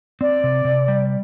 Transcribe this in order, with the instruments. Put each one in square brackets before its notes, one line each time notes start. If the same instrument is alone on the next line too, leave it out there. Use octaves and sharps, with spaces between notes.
[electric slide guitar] C4 [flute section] D5
[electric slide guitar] C3
C3
G3